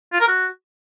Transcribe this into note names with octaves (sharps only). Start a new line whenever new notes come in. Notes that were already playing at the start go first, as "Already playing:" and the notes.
F4
A#4
F#4